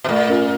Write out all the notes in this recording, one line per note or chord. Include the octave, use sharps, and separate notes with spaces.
B2
A#2 A3
C#4 F4 A#4